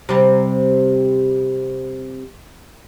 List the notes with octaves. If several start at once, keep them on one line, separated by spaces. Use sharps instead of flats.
C3 G3